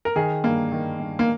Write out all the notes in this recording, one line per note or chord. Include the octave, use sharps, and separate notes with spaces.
A#4
D#3 G#4
G2 A#3
D#3
G2
A#3